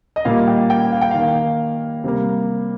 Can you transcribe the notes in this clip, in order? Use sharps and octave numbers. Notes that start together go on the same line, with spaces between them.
D#5
A#2 G3 A#3 F5
G5
G5
F5
G5
D#3 F5
A#3
C3 G3 A#3